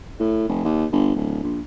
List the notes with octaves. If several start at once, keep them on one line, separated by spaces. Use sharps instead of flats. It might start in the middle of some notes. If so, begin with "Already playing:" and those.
A2
F1
D#2
G1
D1
A#1